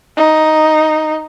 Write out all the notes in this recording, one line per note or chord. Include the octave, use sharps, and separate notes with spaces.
D#4